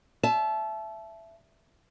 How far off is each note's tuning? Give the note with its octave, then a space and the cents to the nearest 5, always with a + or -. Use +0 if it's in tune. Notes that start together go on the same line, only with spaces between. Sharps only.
E5 +15 A5 -25